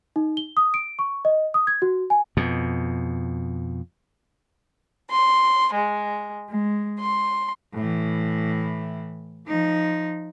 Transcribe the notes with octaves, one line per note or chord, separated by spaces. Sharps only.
D#4
G7
D#6
D7
C#6
D#5
D#6
G#6
F#4
G#5
F2 B2
C6
G#3
G#3
C6
A2 E3
F3 D#4